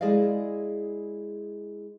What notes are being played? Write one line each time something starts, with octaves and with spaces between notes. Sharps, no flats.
G#3 E4 G#4 D5 D#5 F5